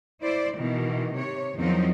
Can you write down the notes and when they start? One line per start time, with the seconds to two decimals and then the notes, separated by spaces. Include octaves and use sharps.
0.22 E4 C5 D5
0.58 B2 D#3 E3
1.14 C3 C#5
1.57 E2 D#3 F3 F#3 C4 D#4